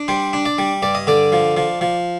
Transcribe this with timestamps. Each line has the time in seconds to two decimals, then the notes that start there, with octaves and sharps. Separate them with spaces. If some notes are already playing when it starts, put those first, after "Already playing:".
Already playing: D4
0.08 G3 C5
0.33 D4
0.45 D5
0.58 G3
0.82 G2 D5
0.95 D#5
1.07 D3 D5
1.32 F3
1.57 F3
1.81 F3